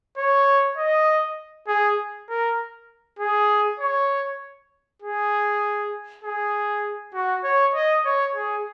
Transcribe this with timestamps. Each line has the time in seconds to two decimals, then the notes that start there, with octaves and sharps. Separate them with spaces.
0.17 C#5
0.77 D#5
1.68 G#4
2.29 A#4
3.19 G#4
3.80 C#5
5.02 G#4
6.23 G#4
7.13 F#4
7.44 C#5
7.74 D#5
8.05 C#5
8.35 G#4